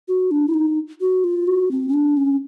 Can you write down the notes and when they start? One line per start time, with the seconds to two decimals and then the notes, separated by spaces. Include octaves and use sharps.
0.08 F#4
0.31 D4
0.48 E4
0.54 D#4
1.01 F#4
1.24 F4
1.47 F#4
1.71 C4
1.89 C#4
1.94 D4
2.17 C#4